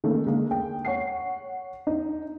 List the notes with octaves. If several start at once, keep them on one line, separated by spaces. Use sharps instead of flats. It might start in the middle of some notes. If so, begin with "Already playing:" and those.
D#3 A3 A#3 C#4
D3 G#3 A#3
G5
C#5 F#5 C7
D#4